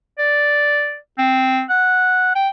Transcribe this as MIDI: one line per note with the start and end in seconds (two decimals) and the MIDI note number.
0.18 0.97 74
1.18 1.63 60
1.69 2.33 78
2.36 2.49 79